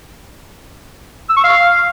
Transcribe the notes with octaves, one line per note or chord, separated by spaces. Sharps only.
E6
C#6
F5